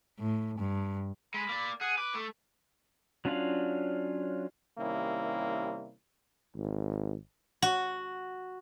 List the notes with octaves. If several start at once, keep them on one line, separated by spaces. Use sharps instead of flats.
A2
G2
G#3 B5
A#3 D5
G#4 F#5
B4 D6
A3
F#3 C#4 D4 F4 F5
C3 D#3 G3 A#3 C#4 E4
G#1
F#4